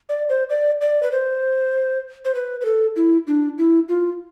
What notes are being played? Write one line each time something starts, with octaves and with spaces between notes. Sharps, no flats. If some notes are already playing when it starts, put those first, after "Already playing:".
D5
C5
D5
D5
B4
C5
C5
B4
B4
A4
E4
D4
E4
F4